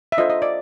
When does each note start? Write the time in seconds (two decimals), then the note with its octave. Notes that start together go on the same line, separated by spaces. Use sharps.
0.12 E5
0.17 D4 F4 A4 C5 D#5
0.30 D#5
0.42 D5